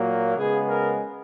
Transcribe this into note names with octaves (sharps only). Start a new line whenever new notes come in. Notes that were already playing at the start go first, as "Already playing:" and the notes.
Already playing: A#2 F#3 A#3
C#3 G#3 B3 G#4
A#4